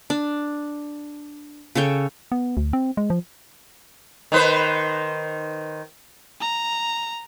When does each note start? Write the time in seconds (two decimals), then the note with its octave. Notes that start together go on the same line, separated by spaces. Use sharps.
0.10 D4
1.75 C#3 A4 C#5 G5
2.32 B3
2.57 D2
2.73 C4
2.97 G#3
3.10 F3
4.32 D#3 B4 C5
6.41 A#5